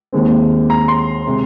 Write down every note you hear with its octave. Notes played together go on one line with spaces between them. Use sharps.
D#2 D#3 G#3 C4
A#5
C6
C3 G#3